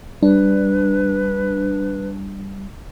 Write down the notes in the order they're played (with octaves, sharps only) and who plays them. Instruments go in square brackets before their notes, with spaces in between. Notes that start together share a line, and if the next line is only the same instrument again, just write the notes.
[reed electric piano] G3 [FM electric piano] D4 [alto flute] B4